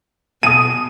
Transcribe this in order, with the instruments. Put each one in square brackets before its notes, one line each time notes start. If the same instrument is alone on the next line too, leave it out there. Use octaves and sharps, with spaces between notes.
[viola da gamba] B2 [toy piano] G#5 A5 D#6 [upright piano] D#7